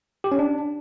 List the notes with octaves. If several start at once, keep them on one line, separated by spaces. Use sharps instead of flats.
G4
C#4
D4